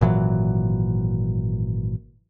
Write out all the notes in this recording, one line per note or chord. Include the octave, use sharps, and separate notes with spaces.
G#1 A#2 E3 F#3